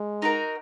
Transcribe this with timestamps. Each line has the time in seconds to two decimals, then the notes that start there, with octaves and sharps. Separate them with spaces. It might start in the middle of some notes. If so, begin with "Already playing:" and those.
Already playing: G#3
0.22 D#4 F#4 A#4